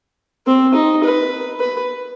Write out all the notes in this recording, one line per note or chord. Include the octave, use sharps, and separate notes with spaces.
C4
D#4
B4
B4